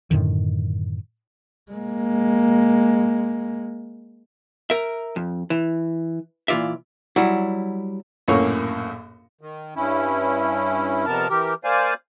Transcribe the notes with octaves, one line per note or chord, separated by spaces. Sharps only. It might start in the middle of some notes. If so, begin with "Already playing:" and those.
F#2 A2 D3 D#3
G#3 A#3
A#4 E5
F2
E3
A#2 E3 F4 D5 E5
F#3 G3 E4
A#1 F#2 A2 A#3 C#5
D#3
G2 C#4 E4
F2 C3 B3 A#4 A5 F6
E3 G4 A#4
A#3 C5 D5 F5 G#5